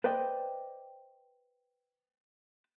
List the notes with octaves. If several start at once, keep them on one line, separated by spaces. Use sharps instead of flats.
B4 C5 D5 D#5 G5